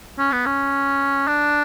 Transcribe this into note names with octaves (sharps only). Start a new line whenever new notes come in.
C#4
B3
C#4
D4